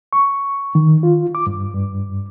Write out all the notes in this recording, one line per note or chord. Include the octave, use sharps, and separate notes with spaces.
C#6
D#3
F4
D6
G2
G2